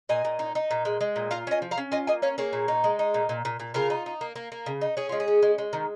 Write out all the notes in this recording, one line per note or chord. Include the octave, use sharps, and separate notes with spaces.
A#2 D#5 G#5
A#2
D#4
D#4
A#2
G#3
G#3
A#2
F4 F5 A#5
C#4 D#5 G#5
F3
F5 A#5
C#4
F4 D#5 G#5
A#3 D#5 G#5
C#4 C#5 F5
A#3 G#4 C#5
A#2
D#4
G#3
D#4
A#2
A#2
A#2
A#2
C#3 F4 A#4
D#4
D#4
A#3
A#3
A#3
C#3
D#4
C#4 G#4
G#3 F4
G#4
C#4
G#3
G#3
D#3